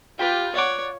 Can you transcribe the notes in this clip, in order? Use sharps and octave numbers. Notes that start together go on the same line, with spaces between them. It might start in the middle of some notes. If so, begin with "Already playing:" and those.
F4 G4 B4 G5
C#5 D5 F#5 D6